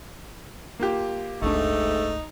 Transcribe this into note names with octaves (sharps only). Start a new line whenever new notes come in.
A#3 F4 G4
F#1 C#2 G#2 A3 D4 D#4